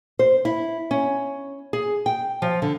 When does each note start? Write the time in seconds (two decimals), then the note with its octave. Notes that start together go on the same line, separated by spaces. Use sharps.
0.19 C5
0.45 E4
0.91 C#4
1.73 G#4
2.06 G5
2.42 F3
2.62 D3